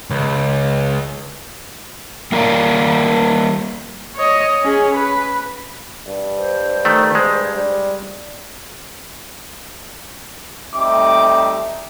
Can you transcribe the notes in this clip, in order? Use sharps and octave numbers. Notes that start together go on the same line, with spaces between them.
C#2
G3 A#3 A#4 C#5 D5 F5
C#5 D#5
C#4 G#4
B4
G2
C5
D#3 A3
G#3
G3
G3 A3 C4 D#4 E5 D6